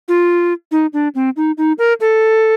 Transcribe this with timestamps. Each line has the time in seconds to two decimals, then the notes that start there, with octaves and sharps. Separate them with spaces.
0.08 F4
0.71 D#4
0.93 D4
1.15 C4
1.37 D#4
1.58 D#4
1.78 A#4
2.00 A4